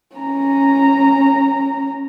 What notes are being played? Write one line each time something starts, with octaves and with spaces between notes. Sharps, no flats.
C#4 A#5